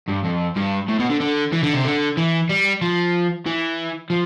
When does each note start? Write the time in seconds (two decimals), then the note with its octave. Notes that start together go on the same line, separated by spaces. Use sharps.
0.08 G2
0.25 F2
0.57 G2
0.89 A2
1.00 B2
1.10 D3
1.21 D3
1.53 E3
1.63 D3
1.74 C3
1.85 D3
2.17 E3
2.50 G3
2.82 F3
3.46 E3
4.10 F3